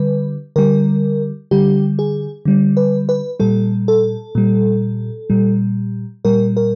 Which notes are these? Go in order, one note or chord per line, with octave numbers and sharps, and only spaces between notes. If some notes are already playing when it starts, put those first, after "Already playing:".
Already playing: D3 G3 B4
D3 G3 A#4
D3 G3 G4
G#4
D3 G3
B4
B4
A#2 G3 A4
A4
A#2 G3
A#2 G3
A#2 G3 A#4
A#4